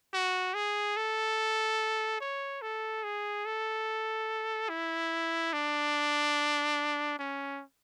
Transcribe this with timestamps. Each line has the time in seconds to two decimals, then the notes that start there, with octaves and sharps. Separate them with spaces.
0.13 F#4
0.54 G#4
0.96 A4
2.20 C#5
2.62 A4
3.03 G#4
3.46 A4
4.69 E4
5.53 D4
7.19 C#4